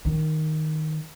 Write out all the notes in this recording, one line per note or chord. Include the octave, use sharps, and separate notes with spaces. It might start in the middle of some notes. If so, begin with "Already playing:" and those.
D#3